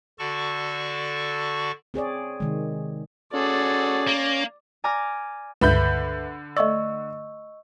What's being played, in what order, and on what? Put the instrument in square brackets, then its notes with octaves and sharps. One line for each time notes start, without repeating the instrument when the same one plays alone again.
[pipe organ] D3 F#4 A4 D5 A5 C#6
[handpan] C4 G#4 C#5 D5
C3 D#3 G#3
[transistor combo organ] C#4 [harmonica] F#4 G#4 A4 [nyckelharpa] D5
[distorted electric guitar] A#3
[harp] D5 G#5 A#5 D6 F6 A#6
[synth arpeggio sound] C#2 G2 [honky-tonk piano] D3 B5 G6 [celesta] B4 E5
[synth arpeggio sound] A3 D5 [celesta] D#5 C#6 E6